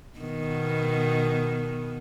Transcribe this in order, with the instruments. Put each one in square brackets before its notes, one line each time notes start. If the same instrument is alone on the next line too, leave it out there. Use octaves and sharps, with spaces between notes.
[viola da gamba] B2 D#3 B3